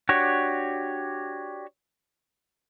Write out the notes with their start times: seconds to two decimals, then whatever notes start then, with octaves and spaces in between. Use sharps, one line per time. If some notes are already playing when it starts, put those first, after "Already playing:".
0.09 D4 F#4 G4 C#5